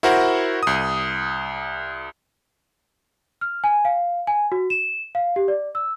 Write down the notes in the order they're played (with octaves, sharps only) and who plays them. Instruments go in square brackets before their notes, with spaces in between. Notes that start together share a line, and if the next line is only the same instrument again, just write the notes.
[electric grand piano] E4 F#4 A#4 C5 F#5
C2 D#6
[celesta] F6
G#5
F5
G#5
F#4
E7
F5
G4
D5
E6